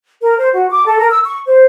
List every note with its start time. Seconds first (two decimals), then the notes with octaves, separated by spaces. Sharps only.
0.21 A#4
0.38 C5
0.53 F#4
0.70 D6
0.85 A4
0.99 A#4
1.10 E6
1.24 C#6
1.46 C5